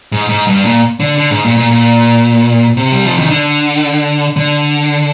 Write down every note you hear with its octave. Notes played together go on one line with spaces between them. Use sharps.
G#2
G#2
G2
A#2
D3
D3
G#2
A#2
A#2
A#2
C3
G3
F3
D#3
D3
D3